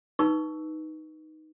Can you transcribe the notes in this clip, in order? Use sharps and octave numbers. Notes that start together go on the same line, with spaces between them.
D#4 B4 C#6 E6